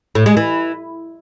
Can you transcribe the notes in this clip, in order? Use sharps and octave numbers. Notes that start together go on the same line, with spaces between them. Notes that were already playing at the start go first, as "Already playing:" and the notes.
A2
G#3
E3